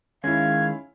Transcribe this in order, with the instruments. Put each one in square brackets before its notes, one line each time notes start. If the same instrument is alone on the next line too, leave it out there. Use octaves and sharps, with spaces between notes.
[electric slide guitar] D#3 G#3 [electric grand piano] C#4 E4 [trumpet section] F5 [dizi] G#6